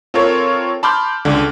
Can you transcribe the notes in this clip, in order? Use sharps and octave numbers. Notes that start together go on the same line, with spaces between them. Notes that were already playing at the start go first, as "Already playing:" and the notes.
C4 F4 A4 A#4 C#5
A5 B5 C6 D6 F6 G6
C#2 D3